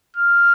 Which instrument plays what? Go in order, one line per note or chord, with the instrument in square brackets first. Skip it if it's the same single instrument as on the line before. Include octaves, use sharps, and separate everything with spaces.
[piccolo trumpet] F6